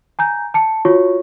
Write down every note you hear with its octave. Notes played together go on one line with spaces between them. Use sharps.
G#5 A#5 G6
A5 C#7
F4 F#4 C#5 C#6